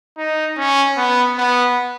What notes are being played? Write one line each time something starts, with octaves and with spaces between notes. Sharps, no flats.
D#4
C#4
B3
B3